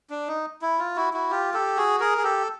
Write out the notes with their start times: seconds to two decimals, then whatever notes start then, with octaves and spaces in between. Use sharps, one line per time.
0.10 D4
0.28 D#4
0.62 E4
0.79 F4
0.96 E4 F#4
1.13 E4 F#4
1.31 F4 G4
1.54 G4 A4
1.77 F#4 G#4
2.00 G#4 A#4
2.18 G#4
2.23 G4 A4